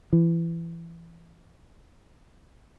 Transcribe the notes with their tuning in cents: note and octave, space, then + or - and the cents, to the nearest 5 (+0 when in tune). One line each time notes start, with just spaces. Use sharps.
E3 +25